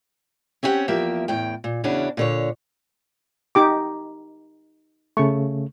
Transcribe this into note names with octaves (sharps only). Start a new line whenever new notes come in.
C4 C#4 E4 G4 C#5 F#5
E2 F3 A#3 G4 E5
E2 A2 G5
A#2
E2 C#3 C#4 D4 E4 F#4
A#2 D3 C#5
D#4 G4 D6
C#3 A3 C#6